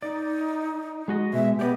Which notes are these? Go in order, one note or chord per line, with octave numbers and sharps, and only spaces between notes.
D#4 D5
G#3 F#4 D#5
B2 G#3 E5
B3 G4 D5 D#5